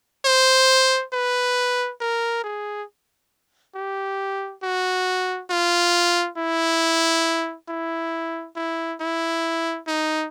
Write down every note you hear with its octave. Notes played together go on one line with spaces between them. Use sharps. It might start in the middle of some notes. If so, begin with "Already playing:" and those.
C5
B4
A#4
G#4
G4
F#4
F4
E4
E4
E4
E4
D#4